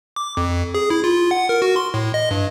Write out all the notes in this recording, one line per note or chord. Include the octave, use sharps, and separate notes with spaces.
D6
F2
G#4
E4
F4
F#5
A#4
F#4
C6
A2
D#5
G2